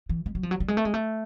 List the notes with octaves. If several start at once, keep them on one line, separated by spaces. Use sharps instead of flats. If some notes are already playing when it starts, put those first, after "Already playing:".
E3
G#3
F#3
F3
F#3
G3
G#3
A3
G#3
A3